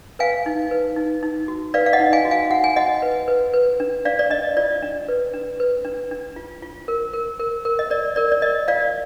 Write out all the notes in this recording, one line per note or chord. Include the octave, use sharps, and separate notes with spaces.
B4 F5 G#5
D#4
B4
D#4
D#4
F#4
B4 D5 F5
F5
D#5 F#5
D#4
F5 G#5
F#4
F5 G#5
F#4 F#5
G#5
F#4 D#5 F#5
B4
B4
B4
D4
D4 D5 F5
D5
D4 D#5
F4 D5
D4
B4
D4
B4
D4
D4
F4
F4
A#4
A#4
A#4
A#4
D#5
A#4 D5
A#4 D5
D5
A#4 D#5
F4 D5 F5